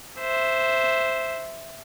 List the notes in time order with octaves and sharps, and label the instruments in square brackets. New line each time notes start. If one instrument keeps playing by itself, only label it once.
[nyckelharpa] C5 E5